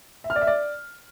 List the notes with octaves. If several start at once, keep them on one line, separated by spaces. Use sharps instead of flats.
E5
F6
D5
E5
D5